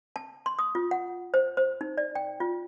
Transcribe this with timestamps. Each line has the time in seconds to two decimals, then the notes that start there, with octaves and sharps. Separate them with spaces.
0.16 A5
0.46 C6
0.59 D#6
0.75 F4
0.91 F#5
1.34 C5
1.57 C5
1.81 D#4
1.97 D5
2.15 G5
2.40 F4